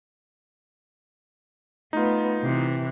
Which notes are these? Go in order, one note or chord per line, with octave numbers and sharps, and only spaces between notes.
A3 B3 D#4 F4
C3 E3